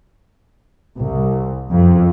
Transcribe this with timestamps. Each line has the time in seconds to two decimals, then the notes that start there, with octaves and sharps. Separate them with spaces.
0.97 C2
1.72 F2